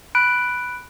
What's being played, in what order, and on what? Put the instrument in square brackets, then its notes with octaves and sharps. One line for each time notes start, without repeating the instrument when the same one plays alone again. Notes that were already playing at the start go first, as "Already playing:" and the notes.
[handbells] B5 F#6 D7